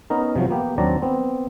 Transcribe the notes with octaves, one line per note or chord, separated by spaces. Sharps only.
B3 C#4 D#4 A#4
C3 F3 F#3
A#3 B3 G4
D#2 F#3 C4 D4 D5 A#5
B3 C4